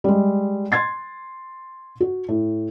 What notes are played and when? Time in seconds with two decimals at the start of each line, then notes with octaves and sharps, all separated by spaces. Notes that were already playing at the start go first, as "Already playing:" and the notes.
0.04 G3 G#3
0.72 C6 G#6 A6 C7
2.00 F#4
2.28 A2